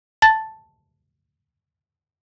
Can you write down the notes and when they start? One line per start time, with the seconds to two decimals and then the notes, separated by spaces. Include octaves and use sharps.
0.22 A5 A6